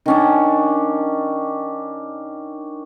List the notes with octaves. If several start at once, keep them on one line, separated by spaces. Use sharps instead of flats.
D#3 C#4 D4